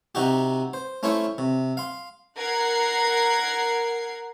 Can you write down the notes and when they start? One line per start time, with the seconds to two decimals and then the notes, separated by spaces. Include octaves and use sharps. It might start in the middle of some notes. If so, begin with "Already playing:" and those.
0.15 C3 D#4 F#4 G4
0.73 C5
1.03 A3 C#4 E4 C5 C#5
1.38 C3
1.77 F5 C6
2.37 A#4 F#5 G#6 C7